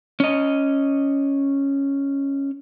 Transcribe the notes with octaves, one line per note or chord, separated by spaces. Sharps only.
C#4 D#5